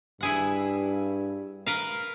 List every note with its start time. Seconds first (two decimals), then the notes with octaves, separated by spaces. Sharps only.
0.21 G2 E4 G#4 F#5
1.66 A#4 B4 F5